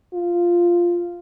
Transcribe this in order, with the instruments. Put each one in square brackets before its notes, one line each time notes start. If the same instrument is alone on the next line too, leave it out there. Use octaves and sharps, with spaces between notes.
[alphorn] F4